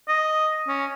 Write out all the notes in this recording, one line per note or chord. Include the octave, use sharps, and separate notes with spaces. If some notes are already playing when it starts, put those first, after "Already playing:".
D#5
C#4